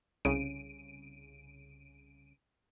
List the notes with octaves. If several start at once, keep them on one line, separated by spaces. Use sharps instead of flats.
C2 C#3 D7 D#7